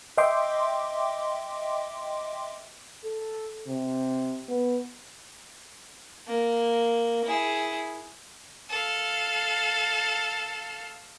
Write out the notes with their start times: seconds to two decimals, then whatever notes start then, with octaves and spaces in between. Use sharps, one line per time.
0.18 D#5 E5 G5 C6 D6
3.05 A4
3.67 C3
4.49 B3
6.28 A#3
7.24 E4 G#4
8.71 A4 F5